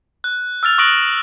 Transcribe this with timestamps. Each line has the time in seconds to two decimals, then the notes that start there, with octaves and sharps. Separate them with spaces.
0.24 F#6
0.63 E6 F6 A6 F7
0.78 C#6 D#6 F#6 A#6 D7 F#7